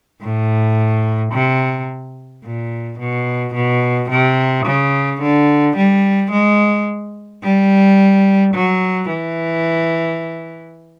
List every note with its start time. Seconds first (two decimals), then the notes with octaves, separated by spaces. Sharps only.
0.22 A2
1.33 C3
2.44 A#2
2.99 B2
3.55 B2
4.10 C3
4.66 C#3
5.22 D3
5.77 G3
6.32 G#3
7.44 G3
8.54 F#3
9.09 E3